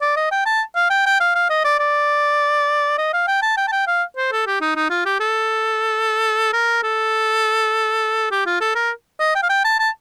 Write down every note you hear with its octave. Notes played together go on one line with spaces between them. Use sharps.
D5
D#5
G5
A5
F5
G5
G5
F5
F5
D#5
D5
D5
D#5
F5
G5
A5
G5
A5
G5
F5
C5
A4
G4
D#4
D#4
F4
G4
A4
A#4
A4
G4
F4
A4
A#4
D#5
G5
F5
G5
A5
A5